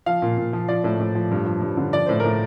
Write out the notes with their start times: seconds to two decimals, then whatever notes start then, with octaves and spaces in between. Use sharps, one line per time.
0.06 F3 F5
0.22 A#2
0.37 A#2
0.53 F3
0.68 F3 D5
0.84 A2
1.00 A2
1.15 F3
1.31 G2
1.46 F3
1.62 G2
1.77 D3
1.93 F3 D5
2.06 A2 C5
2.20 A2 A#4